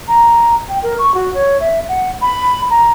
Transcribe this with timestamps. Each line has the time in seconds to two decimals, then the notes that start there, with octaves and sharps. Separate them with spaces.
0.08 A#5
0.69 G5
0.83 A#4
0.99 C#6
1.14 F#4
1.34 C#5
1.60 E5
1.89 F#5
2.22 B5
2.70 A#5